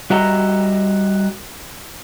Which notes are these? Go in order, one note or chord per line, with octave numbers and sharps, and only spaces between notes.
G3 F#4 D#5 E5 A#5